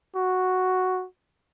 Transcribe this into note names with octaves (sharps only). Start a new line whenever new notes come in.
F#4